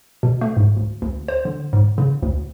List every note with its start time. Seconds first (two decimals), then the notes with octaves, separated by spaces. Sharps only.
0.23 B2
0.41 A3
0.57 G#2
0.77 D2
1.02 D2
1.28 C5
1.45 D3
1.73 G#2
1.98 C#3
2.23 D2